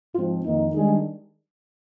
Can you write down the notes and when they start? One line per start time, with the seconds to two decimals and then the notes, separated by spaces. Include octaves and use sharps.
0.15 G#2 F3 C4 F4
0.45 F2 D#3 A#3 D#4
0.75 D#3 G3 G#3 D4 G#4